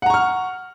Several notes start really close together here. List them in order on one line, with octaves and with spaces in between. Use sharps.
F#5 A#5 C#6 F6